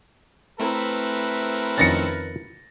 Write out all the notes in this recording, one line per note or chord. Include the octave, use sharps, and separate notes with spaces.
A3 C4 E4 A#4 B4
F2 D#3 C#4 A6 A#6 C#7